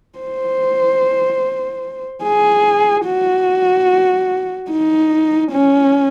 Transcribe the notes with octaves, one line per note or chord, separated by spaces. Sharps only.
C5
G#4
F#4
D#4
C#4